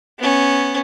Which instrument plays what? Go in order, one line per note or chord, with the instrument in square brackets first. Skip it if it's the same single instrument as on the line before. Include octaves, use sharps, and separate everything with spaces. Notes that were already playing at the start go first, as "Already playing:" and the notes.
[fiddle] B3 C#4